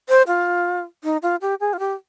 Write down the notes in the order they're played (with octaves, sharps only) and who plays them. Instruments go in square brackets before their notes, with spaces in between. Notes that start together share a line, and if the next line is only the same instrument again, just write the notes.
[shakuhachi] C5
F4
D#4
F4
G4
G#4
F4
G4